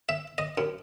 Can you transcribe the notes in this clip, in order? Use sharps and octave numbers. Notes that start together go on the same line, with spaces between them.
E5
D#5
F#2